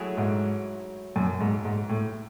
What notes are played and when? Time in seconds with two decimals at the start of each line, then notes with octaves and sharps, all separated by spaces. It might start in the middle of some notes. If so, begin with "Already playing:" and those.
Already playing: F#3 A3 E4 G#4
0.17 G#2
1.16 F#2
1.40 G#2
1.65 G#2
1.89 A2